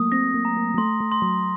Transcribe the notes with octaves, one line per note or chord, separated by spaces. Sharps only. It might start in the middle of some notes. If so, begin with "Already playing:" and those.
Already playing: F#3 A3 A#3 D#6
C4 A#6
A#3
A#5
A#3
F#3
A3 C6
A3
C6
F#3